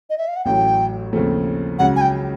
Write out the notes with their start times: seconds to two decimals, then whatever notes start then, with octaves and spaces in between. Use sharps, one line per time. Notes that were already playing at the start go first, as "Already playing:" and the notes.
0.10 D#5
0.18 E5
0.28 F5
0.36 F#5
0.45 A1 A2 F#3 G5
1.13 D#2 C#3 F3 A3 C4
1.79 C#2 C#3 F#3 F#5
1.96 G#5
2.01 G5